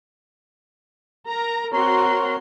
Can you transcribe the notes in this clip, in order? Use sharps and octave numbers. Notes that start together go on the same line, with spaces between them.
A#4 A#5
C4 F#4 A#4 C#5 A#5 C6